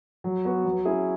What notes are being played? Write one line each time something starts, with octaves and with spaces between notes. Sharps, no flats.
F#3
B3 F#4
F#3
C#4 E4 G#4